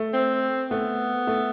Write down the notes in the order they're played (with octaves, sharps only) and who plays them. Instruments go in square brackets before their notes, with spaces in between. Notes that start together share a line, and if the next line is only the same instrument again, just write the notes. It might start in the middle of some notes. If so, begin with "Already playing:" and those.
Already playing: [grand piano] A3
[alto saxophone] C4
[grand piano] A3 [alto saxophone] B3
[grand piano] A3